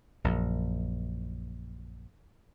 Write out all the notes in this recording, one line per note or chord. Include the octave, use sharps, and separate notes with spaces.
A#1 F#2